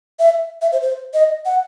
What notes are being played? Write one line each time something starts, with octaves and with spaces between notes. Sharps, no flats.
E5
E5
C5
C5
D#5
F#5